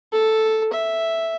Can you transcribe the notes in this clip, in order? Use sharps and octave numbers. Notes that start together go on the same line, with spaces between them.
A4
E5